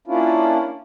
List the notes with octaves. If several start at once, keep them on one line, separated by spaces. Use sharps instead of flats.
A#3 C#4 D4 E4 F4